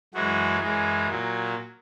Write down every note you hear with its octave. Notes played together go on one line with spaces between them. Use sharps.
F#2 E3 G#3 F#4
F#2 E3 G#3
A#2 F#3